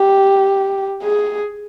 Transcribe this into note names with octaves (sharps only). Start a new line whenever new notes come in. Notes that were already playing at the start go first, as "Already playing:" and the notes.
Already playing: G4
G#4